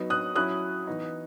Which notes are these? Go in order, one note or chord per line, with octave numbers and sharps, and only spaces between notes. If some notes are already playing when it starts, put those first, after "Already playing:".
Already playing: F#3 B3 D#4
D#6 F#6
F#3 C#4 E4 D#6 F#6
E3 B3 D#4